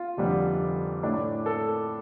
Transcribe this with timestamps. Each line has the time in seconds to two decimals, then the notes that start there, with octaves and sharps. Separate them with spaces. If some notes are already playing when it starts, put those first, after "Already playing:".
Already playing: F4
0.17 F1 F2 D3 G3 D4
1.03 A2 A3 D4
1.46 A4